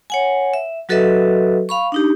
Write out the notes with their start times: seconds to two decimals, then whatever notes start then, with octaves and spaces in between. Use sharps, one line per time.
0.10 C#5 F#5 G#5
0.54 E5
0.89 F#3 F#4 A4 B4 D#5 E5
1.69 F5 B5 C#6
1.92 D4 D#4 G4